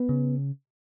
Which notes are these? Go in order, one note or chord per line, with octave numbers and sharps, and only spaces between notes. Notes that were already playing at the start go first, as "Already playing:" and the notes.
Already playing: B3
C#3